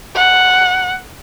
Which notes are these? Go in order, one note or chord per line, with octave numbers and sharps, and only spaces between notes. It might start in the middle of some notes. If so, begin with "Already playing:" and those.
F#5